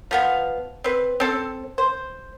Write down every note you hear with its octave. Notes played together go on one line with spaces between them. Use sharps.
F3 B3 F5
C4 B4
C4 A4
C5